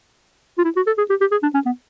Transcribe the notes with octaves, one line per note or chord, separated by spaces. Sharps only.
F4
E4
F#4
A4
G#4
G4
G4
G#4
D4
C#4
B3